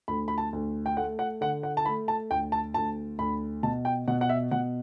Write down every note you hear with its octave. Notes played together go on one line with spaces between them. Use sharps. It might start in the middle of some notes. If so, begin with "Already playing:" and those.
D2 B5
B5
A5
D2
G5
A3 F#5
F#5
D3 F#5
F#5
A5
A3 B5
A5
D2 G5
A5
D2 A5
D2 B5
B2 A5
G5
B2 F#5
F#5
E5
B2 F#5